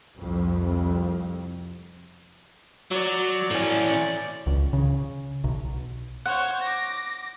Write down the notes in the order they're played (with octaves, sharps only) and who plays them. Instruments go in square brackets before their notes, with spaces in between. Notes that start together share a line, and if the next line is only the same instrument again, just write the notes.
[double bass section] C2 F2
[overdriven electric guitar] F#3 [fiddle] D5
[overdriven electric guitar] A2 C#4
[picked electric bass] C#2
C#3
B1
[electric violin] C5 C#5 [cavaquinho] F#5
[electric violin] D6 A#6